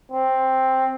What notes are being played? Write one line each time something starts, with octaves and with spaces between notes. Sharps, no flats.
C4